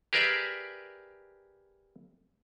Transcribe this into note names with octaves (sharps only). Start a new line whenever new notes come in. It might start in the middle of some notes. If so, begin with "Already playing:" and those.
G4 G#4 A#4 B4 D5 E5